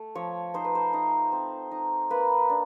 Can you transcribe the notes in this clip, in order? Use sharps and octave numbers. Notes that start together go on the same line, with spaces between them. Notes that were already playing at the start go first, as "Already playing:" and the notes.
Already playing: A3
F3 C#5
D#4 C5
B4
C5
D#4
C4
D#4
A#3 B4
D4